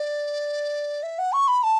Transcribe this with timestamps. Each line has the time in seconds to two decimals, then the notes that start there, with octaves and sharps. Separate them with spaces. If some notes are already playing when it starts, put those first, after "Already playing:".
Already playing: D5
1.03 E5
1.19 F#5
1.33 C#6
1.48 B5
1.63 A5